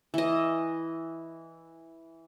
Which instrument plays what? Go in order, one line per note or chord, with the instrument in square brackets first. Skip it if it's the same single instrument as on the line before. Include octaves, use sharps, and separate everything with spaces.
[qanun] E3 D#5